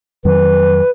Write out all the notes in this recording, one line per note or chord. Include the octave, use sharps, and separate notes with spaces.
F2 D#3 F#3 B4